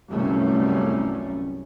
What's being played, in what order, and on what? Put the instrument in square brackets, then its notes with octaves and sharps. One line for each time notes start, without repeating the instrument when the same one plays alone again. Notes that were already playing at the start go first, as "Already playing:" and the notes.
[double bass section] G1 C2 F#2 G3 A3 C#4